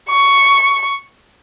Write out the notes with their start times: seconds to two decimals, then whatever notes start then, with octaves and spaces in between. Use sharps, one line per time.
0.10 C#6